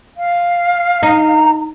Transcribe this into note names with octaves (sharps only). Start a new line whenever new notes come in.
F5
D#4 A#5